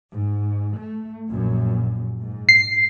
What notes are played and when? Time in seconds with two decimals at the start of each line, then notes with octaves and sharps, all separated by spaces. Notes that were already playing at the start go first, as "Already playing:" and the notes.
0.12 G#2
0.78 A3
1.31 A#1 F#2 A#2
2.19 G#2
2.49 C7